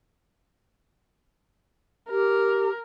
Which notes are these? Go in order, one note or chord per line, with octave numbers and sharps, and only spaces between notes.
G4 A#4